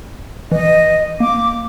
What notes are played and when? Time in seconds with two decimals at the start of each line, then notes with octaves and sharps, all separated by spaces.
0.52 E3 D#5
1.20 A#3 D6